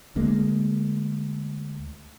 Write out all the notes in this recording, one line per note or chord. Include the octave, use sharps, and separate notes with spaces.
D2 G#3 A#3